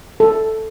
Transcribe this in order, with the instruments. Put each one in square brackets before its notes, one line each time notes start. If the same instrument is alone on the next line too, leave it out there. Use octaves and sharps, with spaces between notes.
[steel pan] A4